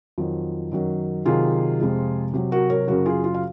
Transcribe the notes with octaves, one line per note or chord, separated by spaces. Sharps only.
F2 D#3 F#3
F#2 D#3 F#3
C3 D#3 F#3 F4 G#4
F2 C3 F3 G#3
C3 F#3
F#4 A#4
A#4 C#5
F#2 C#3 F#3 F#4 A#4
F4 G#4
F4
F5